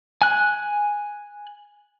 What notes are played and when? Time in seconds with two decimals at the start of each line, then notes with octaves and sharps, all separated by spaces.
0.22 G#5 F#6